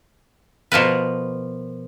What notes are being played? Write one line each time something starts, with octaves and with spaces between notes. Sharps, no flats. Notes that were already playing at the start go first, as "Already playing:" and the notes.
B2 F3 A#4 B4